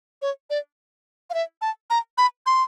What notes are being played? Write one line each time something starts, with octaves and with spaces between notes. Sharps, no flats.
C#5
D5
F5
E5
A5
A#5
B5
C6